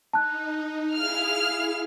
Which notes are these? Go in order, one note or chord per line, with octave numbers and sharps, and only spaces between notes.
D#4 A5 F#6
E4 G#4 F5 F6